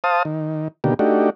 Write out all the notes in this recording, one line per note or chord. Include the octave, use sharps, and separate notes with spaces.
C5 F5 A5 D#6
D#3
B2 D3 D#3 A#3 G4
A3 D4 D#4 F#4 G4